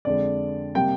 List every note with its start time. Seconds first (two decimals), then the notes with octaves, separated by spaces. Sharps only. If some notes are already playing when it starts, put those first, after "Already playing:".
0.05 F2 D3 G#3 D5
0.75 C3 G3 A#3 G5